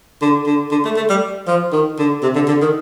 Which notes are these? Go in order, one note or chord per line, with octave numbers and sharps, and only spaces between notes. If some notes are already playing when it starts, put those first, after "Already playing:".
D3
D3
D3
A3
A3
G3
F3
D#3
D3
C3
D3
D3
D#3